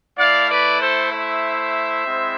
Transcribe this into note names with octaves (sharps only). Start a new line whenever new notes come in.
A3 E4 D5 F5
B4 D5
A4 C5
C5 E5
G#3 C4 E4